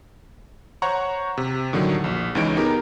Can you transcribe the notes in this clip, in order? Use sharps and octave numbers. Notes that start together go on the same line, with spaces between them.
C5 C#5 F#5 A#5 C#6
C3
A2 D3 D#3 F#3 G3 A3
A#1
C#2 C#3 E3 D#4 C#5 D7
B3 D#4 G4 G#4 A#4